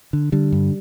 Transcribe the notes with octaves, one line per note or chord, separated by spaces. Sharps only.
D3
D3 G3
G2